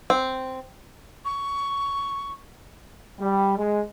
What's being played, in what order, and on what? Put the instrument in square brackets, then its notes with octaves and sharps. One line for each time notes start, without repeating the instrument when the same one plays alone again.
[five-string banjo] C4
[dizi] C#6
[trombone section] G3
G#3